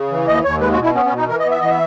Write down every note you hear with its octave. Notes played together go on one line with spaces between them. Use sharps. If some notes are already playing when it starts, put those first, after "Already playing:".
Already playing: C#3
E3
D#2 D#5
D#2 C#5
G#3 B4
F#4
B2
E4
B3 C#4
C#4
B2
D#4
E3 A#4
D#5
B3
E5
E3 D#5
E5